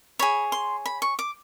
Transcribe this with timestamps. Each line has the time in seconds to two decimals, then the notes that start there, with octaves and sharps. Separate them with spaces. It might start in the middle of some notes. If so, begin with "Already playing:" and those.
0.19 G#4 C#5 B5
0.52 C6
0.86 B5
1.02 C#6
1.19 D6